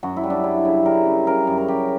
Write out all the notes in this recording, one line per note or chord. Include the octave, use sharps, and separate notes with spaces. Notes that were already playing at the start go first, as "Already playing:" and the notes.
F#2 F#4
E4
G3
D4
G3 E4
C#3
G3 A#4
C#3
C#3 A#4
F#2
A#4
F#2 G4